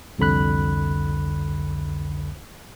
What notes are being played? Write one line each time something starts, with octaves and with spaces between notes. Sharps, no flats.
C2 F2 D3 B5 F#6